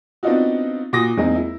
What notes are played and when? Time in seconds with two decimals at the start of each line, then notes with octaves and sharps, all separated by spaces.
0.23 B3 C4 D4 D#4 F4 F#4
0.93 A#2 F#4 D6 D#6 A#6
1.17 E2 G#3 A#3 C4 D#4
1.35 E4